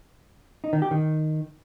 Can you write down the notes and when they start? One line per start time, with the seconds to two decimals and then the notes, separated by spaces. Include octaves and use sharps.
0.64 D#4
0.73 D#3
0.82 G4
0.91 D#3